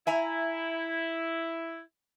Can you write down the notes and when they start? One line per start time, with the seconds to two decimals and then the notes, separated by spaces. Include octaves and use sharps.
0.07 E4 E5 G#5 A#5